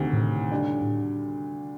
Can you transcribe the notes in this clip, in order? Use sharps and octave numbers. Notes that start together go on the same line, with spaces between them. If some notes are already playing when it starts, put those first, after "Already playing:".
Already playing: D2 C3 D#3
A2
D3 G3 D4